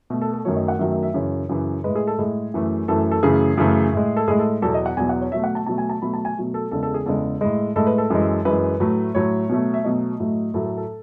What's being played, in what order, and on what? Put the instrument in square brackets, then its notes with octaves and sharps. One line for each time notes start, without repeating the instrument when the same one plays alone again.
[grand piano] B2 A3
A4
A4
F#2 D#3 F#3 A3 C#5
D#5
F#5
F#2 D#3 F#3 A3 E5
E5
E5
F#2 C#3 E3 C#5
F#2 C#3 E3
A2 G#3 B4
G#4
A4
A2 G#3 G#4
F#2 E3 A3
F#2 E3 A3 A4
A4
F#2 C#3 E3 A3 G#4
F#2 C#3 E3 A3
A2 G#3
A4
A2 G#3 G#4
A4
E2 B2 F#3 A4
D#5
F#5
E2 B2 F#3 G#5
F#5
C#5
B2 F#3 A3 E5
F#5
A5
B2 F#3 A3 A5
G#5
A5
B2 F#3 A3 B5
A5
G#5
B2 F#3 A3
A4
E2 C#3 G#3 A4
A4
G#4
E2 C#3 G#3 A4
A2 G#3
A2 G#3 A4
B4
A4
F#2 E3 G#3
F#2 E3 G#3 B4
A2 F#3 A3
A2 F#3 A3 C#5
B2 F#3 A3
E5
B2 F#3 A3 D#5
A2 F#3 A3
A2 F#3 A3 A4
A4
A4